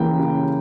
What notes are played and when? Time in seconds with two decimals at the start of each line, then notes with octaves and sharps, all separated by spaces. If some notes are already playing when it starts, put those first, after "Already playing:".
Already playing: C#3 E3 A#3 G5
0.19 C#3